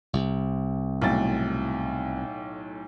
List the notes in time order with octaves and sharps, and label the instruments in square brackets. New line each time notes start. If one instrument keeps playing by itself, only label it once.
[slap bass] C2
[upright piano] B1 A2 A6